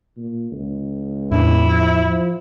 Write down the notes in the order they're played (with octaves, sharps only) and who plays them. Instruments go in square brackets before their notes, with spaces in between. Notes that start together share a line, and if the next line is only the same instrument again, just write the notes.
[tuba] A#2
C#2
[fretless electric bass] E2 A2 D4 [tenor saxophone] E4
[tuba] F3
F3